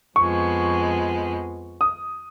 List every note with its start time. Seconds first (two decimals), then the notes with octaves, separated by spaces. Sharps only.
0.16 F2 F3 G#3 B3 C#6
1.81 D#6